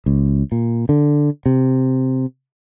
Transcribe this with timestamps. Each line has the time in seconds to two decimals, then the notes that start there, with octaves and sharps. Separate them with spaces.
0.06 C#2
0.52 A#2
0.89 D3
1.46 C3